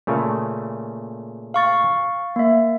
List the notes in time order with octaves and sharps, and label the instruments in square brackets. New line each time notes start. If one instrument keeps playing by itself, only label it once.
[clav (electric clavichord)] A#2 C#3 A3
[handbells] F5 C#6 A6
A#3 E5